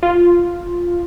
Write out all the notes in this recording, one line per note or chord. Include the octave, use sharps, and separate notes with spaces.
F4